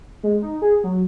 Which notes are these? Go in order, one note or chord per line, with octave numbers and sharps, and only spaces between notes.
G#3
D#4
G#4
F#3